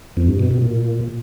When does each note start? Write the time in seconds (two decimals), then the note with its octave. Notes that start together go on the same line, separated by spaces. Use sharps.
0.17 F2
0.28 G2
0.39 B2
0.51 B2
0.62 A#2